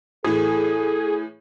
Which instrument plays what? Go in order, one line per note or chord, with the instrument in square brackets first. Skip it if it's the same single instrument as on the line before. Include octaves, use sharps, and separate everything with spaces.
[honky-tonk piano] A2 E3 [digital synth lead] G#4 [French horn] A4